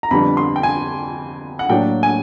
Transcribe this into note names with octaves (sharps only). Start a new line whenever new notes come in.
A#5
F2 D3 G3 B3 D4 B5
C6
G5
G#5
F#5
A2 F#3 A#3 D4 G5
G#5